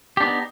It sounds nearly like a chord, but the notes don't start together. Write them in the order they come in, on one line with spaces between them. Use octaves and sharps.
G4 D4 B3 D#4